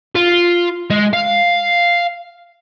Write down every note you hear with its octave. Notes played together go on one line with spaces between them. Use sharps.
F4
G#3
F5